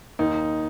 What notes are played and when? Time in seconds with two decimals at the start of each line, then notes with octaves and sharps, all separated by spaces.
0.19 D#2 D#4